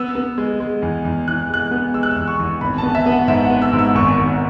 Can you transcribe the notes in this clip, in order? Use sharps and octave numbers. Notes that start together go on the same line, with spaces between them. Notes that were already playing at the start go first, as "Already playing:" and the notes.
Already playing: B3 E6
B3
G#3
G#3
E2
E2
E2 F#6
G#3 F#6
B3
G#3 E6
F#6
E6
E2
C#6
E2
G#1 B5
B3 A5
E5
B3
F#5
G#2 E5
B3 F#5
E6
G#2
E6
G#1 C#6
G#1